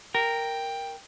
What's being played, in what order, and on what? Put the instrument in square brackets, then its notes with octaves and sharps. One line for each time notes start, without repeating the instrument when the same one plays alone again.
[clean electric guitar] A#4 [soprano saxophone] G5